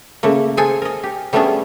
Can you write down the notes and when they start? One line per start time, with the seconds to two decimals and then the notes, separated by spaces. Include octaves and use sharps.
0.23 C#3 A3 A#3
0.57 G#4 A4 C5 G#5
0.82 A#4 D#5
1.03 G4
1.33 G3 A3 B3 C#4 D4 G#4